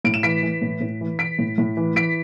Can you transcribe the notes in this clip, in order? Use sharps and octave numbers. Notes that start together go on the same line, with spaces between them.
A2 D7
E7
E3 B6 D7
E3
A2
A2
E3
E3 B6 D7
A2
A2
E3
E3 B6 D7